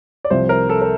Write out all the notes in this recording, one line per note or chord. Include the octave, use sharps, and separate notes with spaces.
D5
C2 C3 F3 C5
A#4
A4
A#4